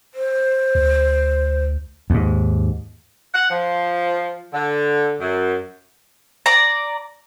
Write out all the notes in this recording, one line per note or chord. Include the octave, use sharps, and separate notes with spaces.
C5
D2
D#2 G#2
F#5
F3
D3
F#2
D5 A#5